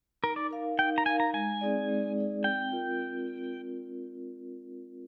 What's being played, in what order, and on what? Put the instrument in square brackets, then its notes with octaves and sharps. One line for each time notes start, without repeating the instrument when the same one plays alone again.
[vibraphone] D#4 [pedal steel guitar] A#4
[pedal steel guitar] D5
[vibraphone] A#4 F5
[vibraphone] D#4 [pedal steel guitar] G5
[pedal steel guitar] A#5
[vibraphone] A#4 F5 [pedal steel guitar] G#5
[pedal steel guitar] A#5
[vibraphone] G#3 [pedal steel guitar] G#5
[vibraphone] C4 D#4 G#4 D5
G#3
C4 D#4 G#4 D5
[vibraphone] C4 [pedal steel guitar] G5
[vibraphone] F4 A#4
C4